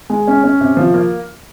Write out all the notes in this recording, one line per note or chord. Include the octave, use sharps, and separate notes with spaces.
G#3
C#4
C#4
C3
F3
A#3